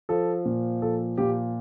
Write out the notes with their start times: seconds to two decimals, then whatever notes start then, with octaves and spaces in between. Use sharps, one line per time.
0.09 F3 A4
0.45 A#2
0.82 F3 A4
1.18 A#2 G4